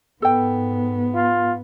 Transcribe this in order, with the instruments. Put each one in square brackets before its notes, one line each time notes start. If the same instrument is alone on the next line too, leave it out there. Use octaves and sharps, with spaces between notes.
[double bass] G#2 B3 [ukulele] A4 G5
[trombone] F4